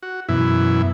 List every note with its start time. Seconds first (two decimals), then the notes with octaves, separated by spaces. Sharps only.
0.03 F#4
0.29 F#2 B2 E3 E4